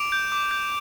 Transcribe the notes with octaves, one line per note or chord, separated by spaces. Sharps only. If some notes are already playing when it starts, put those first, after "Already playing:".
Already playing: D6 D7 F7
G6
D6
G6